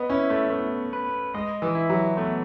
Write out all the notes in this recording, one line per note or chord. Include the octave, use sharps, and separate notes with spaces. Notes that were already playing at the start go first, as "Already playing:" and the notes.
Already playing: B3 D#5
C#4 E4
A3
A3 B3
B4
G#3 D#5
E3
E4
F#3
A3 B3